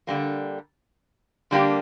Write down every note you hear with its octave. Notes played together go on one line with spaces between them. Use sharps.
D3 G3 A#3
D3 G3 A#3 D4 G4